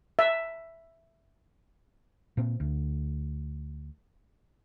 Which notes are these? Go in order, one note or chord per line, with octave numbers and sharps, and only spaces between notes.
E5
A#2 C4
D2